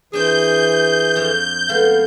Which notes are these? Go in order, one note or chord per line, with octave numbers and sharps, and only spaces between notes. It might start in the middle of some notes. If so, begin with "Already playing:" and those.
E3 C4 D4 G#4 G6
F2 F3 F5
G#3 A3 B3 F5